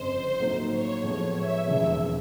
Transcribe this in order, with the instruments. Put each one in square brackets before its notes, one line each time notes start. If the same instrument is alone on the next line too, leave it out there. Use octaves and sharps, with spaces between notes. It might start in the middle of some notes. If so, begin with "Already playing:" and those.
Already playing: [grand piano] G1 F2 C#3 [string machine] C5
[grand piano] A2 F#3 A#3 D#4
[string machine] C#5
[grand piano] A2 F3 G#3 B3 [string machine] C#5
[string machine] E5
[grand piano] E1 D#2 C#3 F3 G#3 [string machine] E5